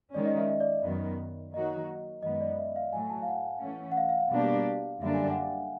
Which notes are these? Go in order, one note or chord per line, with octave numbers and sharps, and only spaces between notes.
D#3 G#3 C#4 D5
D#5
E5
D#5
D5
F#2 D#3 F#3 B3
D#3 F#3 A#3 D#4 F#4 D#5
F#2 D#3 G#3 B3 D#5
D#5
D5
E5
F5
A2 F#3 A3 G#5
A5
F5
F#5
E3 A3 C#4
F#5
F5
F5
F5
B2 G3 A#3 D4 G4
F#2 D3 G3 A#3 D4 E5
G#5
G5
F#5
F5